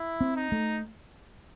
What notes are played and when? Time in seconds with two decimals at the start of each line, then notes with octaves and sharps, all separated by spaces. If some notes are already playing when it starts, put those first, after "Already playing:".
Already playing: E4
0.21 C4
0.36 D#4
0.52 A3